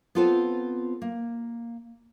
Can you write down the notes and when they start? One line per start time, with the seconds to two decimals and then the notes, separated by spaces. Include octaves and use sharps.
0.15 B3 C4 F4 A4 B4 C5
1.02 A#3